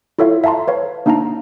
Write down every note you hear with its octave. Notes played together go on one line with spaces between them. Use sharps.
E4 F4 A4 C#5 E5 F5
E5 F5 A5 A#5 C6
B4 C#5 F5
A#3 D4 D#4 F5 A5 A#5